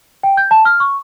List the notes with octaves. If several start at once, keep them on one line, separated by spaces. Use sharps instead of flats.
G5
G6
A5
F6
C#6